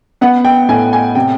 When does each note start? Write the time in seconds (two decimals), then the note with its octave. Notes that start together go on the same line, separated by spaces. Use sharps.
0.21 B3 F#5
0.45 G5
0.69 A2 G#5
0.93 G#5
1.15 C3 G5